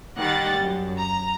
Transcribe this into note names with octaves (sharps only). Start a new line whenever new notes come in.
D#3 G3 G4 F#5 A6
F#2
A#5